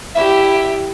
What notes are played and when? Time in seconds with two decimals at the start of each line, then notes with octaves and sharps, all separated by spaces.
0.15 E4 G4 E5